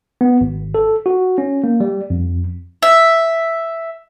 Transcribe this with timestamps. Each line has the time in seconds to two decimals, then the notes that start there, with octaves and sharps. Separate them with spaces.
0.21 B3
0.41 G#1
0.75 A4
1.06 F#4
1.38 C#4
1.64 A#3
1.80 G3
2.10 F2
2.83 E5